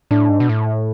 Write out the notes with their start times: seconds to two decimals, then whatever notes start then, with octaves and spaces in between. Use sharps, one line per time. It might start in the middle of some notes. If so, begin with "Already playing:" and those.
0.11 A2 D4
0.29 G#2
0.40 B2
0.49 A2